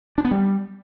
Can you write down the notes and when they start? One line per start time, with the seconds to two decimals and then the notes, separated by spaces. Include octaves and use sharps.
0.18 D4
0.25 B3
0.31 G3